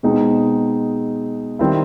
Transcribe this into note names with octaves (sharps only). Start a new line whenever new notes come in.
B2 G#3 C4 D#4
D#3 G3 C4 E4